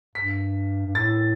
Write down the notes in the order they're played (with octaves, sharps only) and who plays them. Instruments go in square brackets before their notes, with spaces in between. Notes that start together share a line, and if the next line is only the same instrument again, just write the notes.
[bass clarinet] G2 [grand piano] B6
[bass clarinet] G2
[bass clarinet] A2 [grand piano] A6